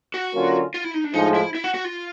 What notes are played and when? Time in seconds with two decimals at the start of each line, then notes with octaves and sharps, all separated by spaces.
0.14 F#4
0.34 D3 F#3 A#3 C#4 F4
0.74 F4
0.84 E4
0.94 D#4
1.04 D4
1.14 A2 F3 G#3 D#4
1.34 E4
1.55 E4
1.64 F#4
1.74 F#4
1.84 F4